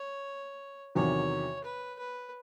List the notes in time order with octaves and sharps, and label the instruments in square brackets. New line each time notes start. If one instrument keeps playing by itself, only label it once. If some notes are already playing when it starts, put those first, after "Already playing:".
Already playing: [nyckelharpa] C#5
[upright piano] E2 C3 D#3 F#3 [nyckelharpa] C#5
[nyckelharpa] B4
B4